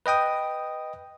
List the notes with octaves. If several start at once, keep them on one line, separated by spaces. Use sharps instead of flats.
B4 D#5 G5 D#6